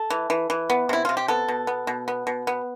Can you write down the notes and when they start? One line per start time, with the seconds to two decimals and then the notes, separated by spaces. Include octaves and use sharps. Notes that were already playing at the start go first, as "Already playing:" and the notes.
Already playing: A4
0.10 E3
0.30 E3
0.50 E3
0.70 B3
0.89 C3 E4
1.05 C3 F4
1.17 G4
1.28 B3 A4
1.48 B2
1.67 B3
1.87 B2
2.08 B3
2.27 B2
2.47 B3